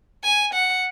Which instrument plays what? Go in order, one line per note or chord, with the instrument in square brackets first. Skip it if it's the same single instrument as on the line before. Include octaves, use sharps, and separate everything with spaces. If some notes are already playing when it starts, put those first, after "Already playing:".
[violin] G#5
F#5